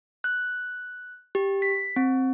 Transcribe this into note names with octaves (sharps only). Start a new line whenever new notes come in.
F#6
G4
B6
C4